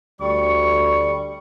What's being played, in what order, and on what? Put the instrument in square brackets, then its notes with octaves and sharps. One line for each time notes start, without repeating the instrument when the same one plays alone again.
[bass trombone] D2 [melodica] G3 [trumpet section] C#6